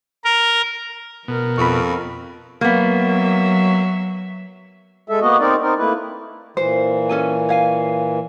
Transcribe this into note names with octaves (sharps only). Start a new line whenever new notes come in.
A#4
B2 B3 A#4
F2 B5 C#6
F#3 A#3 B3 E5
G#3 A4 E5
A#3 B3 F#4 D#5
C4 D#4 A#4 D5
C4 D#4 A#4
A3 A#3 E4 B4
A#2 E3 C5
C#4 A4 G#5
C#5 F5 G#5